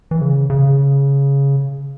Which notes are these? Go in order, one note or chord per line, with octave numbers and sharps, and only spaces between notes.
E3
C#3
C#3